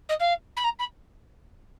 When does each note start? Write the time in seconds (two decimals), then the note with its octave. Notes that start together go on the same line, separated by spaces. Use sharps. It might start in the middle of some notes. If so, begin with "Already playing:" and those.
0.09 D#5
0.20 F5
0.56 B5
0.64 A#5
0.79 B5